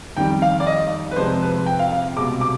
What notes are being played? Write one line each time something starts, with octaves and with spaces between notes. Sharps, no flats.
F2 D#3 G3 G5
F5
D5
D#5
B4
F2 C3 F3 G#3 C5
B4
G5
F5
F5
C2 B2 G#3 D6
D6